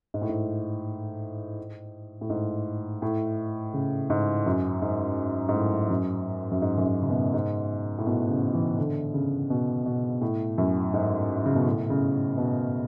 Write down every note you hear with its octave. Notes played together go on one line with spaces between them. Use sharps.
G#2
A2
G#2
A2
G#2
A2
C#3
G#2
F#2
G#2
G#2
A2
F#2
F#2
G#2
F#2
G#2
C#3
B2
G#2
A2
B2
C#3
E3
D3
C#3
B2
B2
A2
F#2
G#2
C#3
B2
A2
C#3
B2